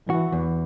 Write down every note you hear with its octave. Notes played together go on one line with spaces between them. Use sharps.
E3 F#4
E2